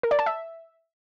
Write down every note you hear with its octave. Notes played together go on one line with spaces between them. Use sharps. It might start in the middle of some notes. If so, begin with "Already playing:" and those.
A#4
D5
A5
E5